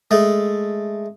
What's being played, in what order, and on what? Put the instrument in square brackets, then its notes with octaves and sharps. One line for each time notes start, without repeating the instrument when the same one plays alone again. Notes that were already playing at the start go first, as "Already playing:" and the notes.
[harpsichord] G#3 A3